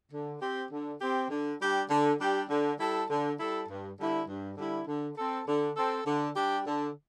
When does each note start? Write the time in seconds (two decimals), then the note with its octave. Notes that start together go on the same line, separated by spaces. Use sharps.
0.12 D3
0.41 C4 G4
0.72 D3
1.01 C4 G4
1.30 D3
1.60 G3 D4 G4
1.90 D3
2.20 G3 D4 G4
2.49 D3
2.79 G3 E4 A4
3.10 D3
3.39 G3 E4 A4
3.69 G2
3.99 D3 G3 E4
4.29 G2
4.57 D3 G3 E4
4.88 D3
5.17 C4 A4
5.48 D3
5.77 C4 A4
6.06 D3
6.36 G3 D4 G4
6.67 D3